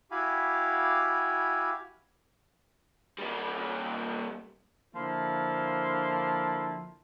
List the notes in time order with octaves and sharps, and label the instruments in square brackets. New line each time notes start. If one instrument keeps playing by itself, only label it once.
[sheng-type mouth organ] E4 F#4 G4 F5 G#5 B5
[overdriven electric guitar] G3 A#3
[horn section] D3 F3 A#3 E4